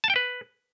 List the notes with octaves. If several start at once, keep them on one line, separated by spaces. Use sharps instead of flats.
A5
G5
B4